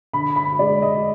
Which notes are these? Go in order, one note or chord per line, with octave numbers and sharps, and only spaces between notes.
D3 B5
B5
G#3 D5
D#5